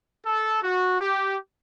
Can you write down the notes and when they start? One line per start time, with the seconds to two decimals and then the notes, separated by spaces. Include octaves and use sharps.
0.23 A4
0.62 F#4
1.00 G4